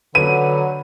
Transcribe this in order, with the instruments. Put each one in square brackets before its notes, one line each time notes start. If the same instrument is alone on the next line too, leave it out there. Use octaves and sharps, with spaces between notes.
[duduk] D3 [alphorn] F#3 [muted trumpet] B4 [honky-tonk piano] D#7